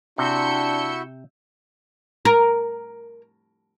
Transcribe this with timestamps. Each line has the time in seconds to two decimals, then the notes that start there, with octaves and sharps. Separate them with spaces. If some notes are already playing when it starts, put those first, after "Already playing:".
0.18 C3 D4 E4 F#4 E5 E6 G6 C#7
2.25 A#4